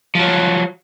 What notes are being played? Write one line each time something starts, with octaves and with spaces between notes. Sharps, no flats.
F3 F#3